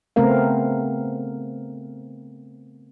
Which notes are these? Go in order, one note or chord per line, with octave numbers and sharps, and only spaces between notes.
C#3 A3 B3 C4 A#4 F5